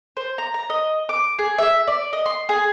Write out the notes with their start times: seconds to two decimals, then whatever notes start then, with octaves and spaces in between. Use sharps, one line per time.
0.17 C5
0.38 A#5
0.54 A#5
0.70 D#5
1.09 D6
1.39 G#4
1.58 E5
1.87 D5
2.13 D#5
2.26 C6
2.49 G#4